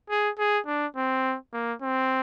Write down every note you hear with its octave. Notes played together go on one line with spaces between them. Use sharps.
G#4
G#4
D4
C4
A#3
C4